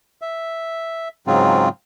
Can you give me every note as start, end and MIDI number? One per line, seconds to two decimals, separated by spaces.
0.22 1.08 76
1.27 1.69 44
1.27 1.69 49
1.27 1.69 54
1.27 1.69 60
1.27 1.69 65